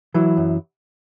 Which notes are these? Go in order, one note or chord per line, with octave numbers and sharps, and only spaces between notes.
E3 F#3 E4
F#2